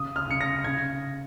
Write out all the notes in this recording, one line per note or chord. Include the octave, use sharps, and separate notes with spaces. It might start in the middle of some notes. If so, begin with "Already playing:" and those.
Already playing: C#3 D#6
F6
C#3 C#7
A#6
C#3 G#6